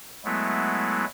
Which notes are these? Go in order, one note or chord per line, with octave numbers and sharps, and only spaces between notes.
F#3 G#3 A3 B3 E4